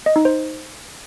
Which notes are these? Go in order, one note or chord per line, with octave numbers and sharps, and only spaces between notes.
D#5
D#4
C5